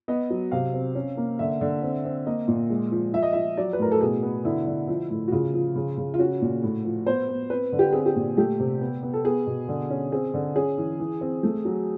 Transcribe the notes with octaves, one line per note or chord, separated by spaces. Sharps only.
B3 D#5
F#3
C3 F5
C4
C#4
A#3
D3 E5
D3
C4
C4
A#3 D#5
A#2
G#3
F3
F3 E5
D#5
F3 E5
F#3 D5
B4
A2 A#4
A4
B2 G#4
B3
D3 E4
D3
F3
A2
F#4
C#3 F4
F3
C#3
C#3
F4
C#4 F#4
A#2
A2
F3
B3 C5
B3
C4 B4
D3
G4
C4 G#4
G4
A#2
A3 G4
C3
B3
B3
A4
B3 G#4
B2
D3
C#4
C4 G#4
D3
C#4 G#4
E3
E3
C4
A3
F#3